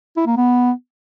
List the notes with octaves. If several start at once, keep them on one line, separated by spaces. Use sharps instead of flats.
E4
A#3
B3